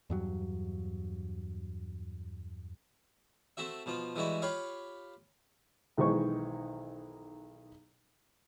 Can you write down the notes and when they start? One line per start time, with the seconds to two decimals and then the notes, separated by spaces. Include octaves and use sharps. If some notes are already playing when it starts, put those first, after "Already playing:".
0.10 E2 G2 F#3
3.57 A3 C4 F#4 E5
3.86 B2 F3 F4
4.16 E3 G3 G#3 D#4 E4 F#4
4.42 F4 G4 C#5 F5 B5 C#6
5.97 B1 D#3 E3 G#3 C5 C#6